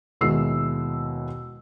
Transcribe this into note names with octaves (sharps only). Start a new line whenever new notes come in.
D#2 B2 G#3 E4 E6 C7